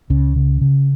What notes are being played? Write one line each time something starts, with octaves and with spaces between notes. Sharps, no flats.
C#2 C#3 C#4
C#3
C#3